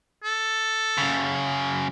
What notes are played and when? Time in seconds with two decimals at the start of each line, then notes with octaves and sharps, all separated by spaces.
0.24 A4
0.98 F#2 C#3